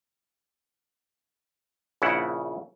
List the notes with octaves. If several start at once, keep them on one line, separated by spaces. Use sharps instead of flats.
A#1 C#3 E4 F#5